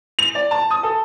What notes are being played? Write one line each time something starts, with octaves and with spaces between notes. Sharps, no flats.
F7
D5
A5
D#6
A4